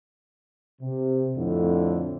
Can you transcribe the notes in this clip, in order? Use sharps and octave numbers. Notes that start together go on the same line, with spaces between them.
C3
F2 A2 D3